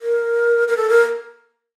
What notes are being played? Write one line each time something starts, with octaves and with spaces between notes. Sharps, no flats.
A#4
A#4
A4
A#4